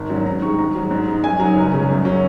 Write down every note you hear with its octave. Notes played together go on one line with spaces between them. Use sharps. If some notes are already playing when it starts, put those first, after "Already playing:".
Already playing: G#1
G#2 F#3 C#4
G#2 A#5
D#3 G#3 C#6
G#2 A#5
F#3 D#4
G#2
G#3 D#4
F#2 G#5
F#3 D#4 A#5
C#2
C#3 G#3 C#4
F#2
F#3 C#4